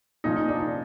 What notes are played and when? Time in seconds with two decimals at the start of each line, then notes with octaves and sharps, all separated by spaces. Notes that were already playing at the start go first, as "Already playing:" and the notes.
0.24 A#2 F3 D#4
0.36 D#4
0.48 D4
0.60 D#4